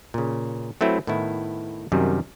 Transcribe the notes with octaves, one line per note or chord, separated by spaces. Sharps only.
A#2 C#3
F#3 A3 C4 E4 B4
A2 D#3 B3 E4
F#2 C3 D#3 F#3 G3